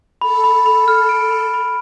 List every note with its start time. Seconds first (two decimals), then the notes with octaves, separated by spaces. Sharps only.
0.21 A4 B5
0.44 B5
0.66 B5
0.88 F6
1.09 D7
1.31 B5
1.54 B5